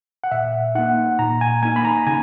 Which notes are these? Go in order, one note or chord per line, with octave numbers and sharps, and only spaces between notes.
F#5
A#2 E5
A#3 D#4 F#5
A#2 A#5
G#5
A#3 D#4 G#5
B5
A#5
C#3 G#5